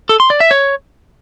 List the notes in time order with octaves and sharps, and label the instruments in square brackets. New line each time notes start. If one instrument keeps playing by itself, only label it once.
[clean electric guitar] A4
C6
D5
E5
C#5